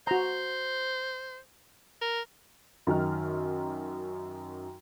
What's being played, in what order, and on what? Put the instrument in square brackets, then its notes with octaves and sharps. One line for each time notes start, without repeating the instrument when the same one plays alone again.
[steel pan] F#4 A#5 [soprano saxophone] C5
[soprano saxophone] A#4
[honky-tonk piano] F#2 D#3 D#4 F6